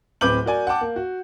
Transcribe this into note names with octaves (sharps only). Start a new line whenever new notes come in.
D1 C4 B4 D6 G6 F#7
F#4 A#4 D5 G#5
F#5 G5 A5 D6
A#3
F#4